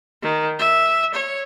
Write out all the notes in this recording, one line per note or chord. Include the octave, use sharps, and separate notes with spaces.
D#3
E5
C#5